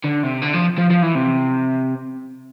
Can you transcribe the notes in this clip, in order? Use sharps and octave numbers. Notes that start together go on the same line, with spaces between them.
D3
C3
D3
F3
F3
F3
E3
C3